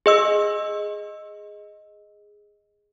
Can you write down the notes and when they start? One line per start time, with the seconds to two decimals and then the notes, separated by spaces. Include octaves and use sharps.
0.06 G#4 D#5 E6